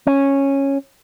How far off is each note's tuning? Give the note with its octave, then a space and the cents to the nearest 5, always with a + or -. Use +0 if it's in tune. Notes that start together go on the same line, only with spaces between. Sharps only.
C#4 -10